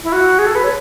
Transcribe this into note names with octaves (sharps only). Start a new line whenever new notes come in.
E4
F#4
G#4
A4
B4
C#5